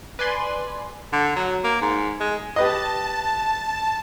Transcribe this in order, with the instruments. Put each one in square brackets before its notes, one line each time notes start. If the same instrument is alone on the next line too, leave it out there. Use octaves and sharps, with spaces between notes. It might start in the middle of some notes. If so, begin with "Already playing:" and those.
[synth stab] B4 D5 G#5 C6
[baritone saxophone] D3
F#3
A#3
G#2
G#3
[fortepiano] G4 B4 D#5 [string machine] A5